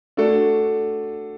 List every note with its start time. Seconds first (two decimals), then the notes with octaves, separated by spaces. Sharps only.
0.17 A3 D4 F#4 A4